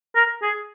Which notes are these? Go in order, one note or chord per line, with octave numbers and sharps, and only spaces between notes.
A#4
G#4